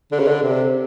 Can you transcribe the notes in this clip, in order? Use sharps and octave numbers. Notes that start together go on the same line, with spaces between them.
D3
C#3
D3
C3